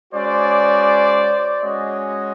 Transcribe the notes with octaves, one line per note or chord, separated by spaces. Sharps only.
G#3 C#4 F#4 C5 D5
G#3 C#4 F#4 C#5 D#5